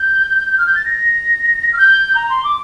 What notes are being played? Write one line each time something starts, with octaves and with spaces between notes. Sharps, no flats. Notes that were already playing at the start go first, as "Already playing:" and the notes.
Already playing: G6
F6
G6
A6
A#6
F6
G6
A#5
C6
D6